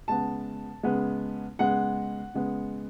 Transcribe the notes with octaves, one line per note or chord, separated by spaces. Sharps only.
C#3 G#3 B3 A5
C#3 G#3 B3
C#3 G#3 B3 F#5
C#3 G#3 B3